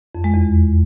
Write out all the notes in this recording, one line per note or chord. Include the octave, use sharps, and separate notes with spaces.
F2
G#3
E2